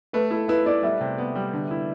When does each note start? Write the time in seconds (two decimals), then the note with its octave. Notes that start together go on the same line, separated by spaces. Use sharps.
0.13 A3 B4
0.31 E4 A4
0.48 E4 B4
0.66 E4 D5
0.83 G3 E5
1.01 C3
1.18 B3
1.35 G3
1.53 D3
1.71 E4